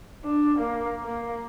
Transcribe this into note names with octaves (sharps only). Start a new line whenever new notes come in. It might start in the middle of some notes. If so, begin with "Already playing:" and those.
D4
A#3
A#3